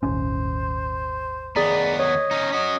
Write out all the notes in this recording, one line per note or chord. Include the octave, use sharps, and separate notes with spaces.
D#1 G#1 C#4 C5
D#2 B3 G#4 D5 A#5
C#5 D#5
C#4 D#4
C#4 F#4 D#5